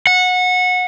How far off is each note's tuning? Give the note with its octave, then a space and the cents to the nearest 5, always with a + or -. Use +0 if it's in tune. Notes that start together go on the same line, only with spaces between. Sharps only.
F#5 -20